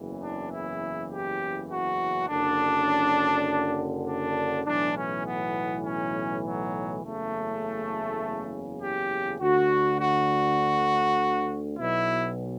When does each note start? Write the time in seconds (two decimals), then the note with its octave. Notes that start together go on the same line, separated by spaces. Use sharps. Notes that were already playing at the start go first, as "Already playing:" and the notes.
Already playing: F#1 E2 C#3 E3
0.22 D4
0.51 E4
1.09 G4
1.69 F#4
2.28 F#1 F#2 D3 D4
4.06 D4
4.65 B1 A2 E3 D4
4.96 C#4
5.25 B3
5.84 C#4
6.43 F#3
7.03 F#1 E2 C#3 A3
8.81 G4
9.40 D2 D3 F#4
9.99 F#4
11.77 B1 B2 E4